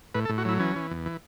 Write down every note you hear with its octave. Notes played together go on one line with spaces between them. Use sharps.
A2 B4
A4
A2
F#4
F#3 E4
E3 C#4
E3
E2
E3